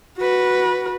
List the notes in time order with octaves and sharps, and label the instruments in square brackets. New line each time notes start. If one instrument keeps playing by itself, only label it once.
[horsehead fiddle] F#4 B4